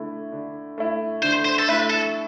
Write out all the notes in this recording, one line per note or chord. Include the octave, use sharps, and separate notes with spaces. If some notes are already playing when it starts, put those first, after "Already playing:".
Already playing: D3 A3 E4
D3
A3 E4
D3 C5
C5
A4
A3 E4 B4
A4